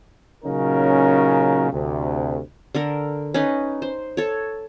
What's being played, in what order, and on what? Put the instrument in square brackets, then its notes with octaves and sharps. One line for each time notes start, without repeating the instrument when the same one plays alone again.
[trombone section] A#2 C#3 F#3 C#4 D#4 A#4
D2 C3
[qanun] D3 A4 A#4
C#4 D#4 B4 D#5
C5
A4 C#5